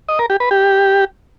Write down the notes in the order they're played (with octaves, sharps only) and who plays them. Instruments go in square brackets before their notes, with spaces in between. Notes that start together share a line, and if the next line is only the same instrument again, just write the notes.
[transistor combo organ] D#5
A#4
G4
B4
G4